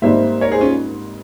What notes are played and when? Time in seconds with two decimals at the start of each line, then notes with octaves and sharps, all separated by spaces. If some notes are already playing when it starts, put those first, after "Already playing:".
0.02 G#1 G#2 G3 A#3 C5 E5
0.41 A#4 C#5
0.52 G#4 C5
0.61 C#4 F4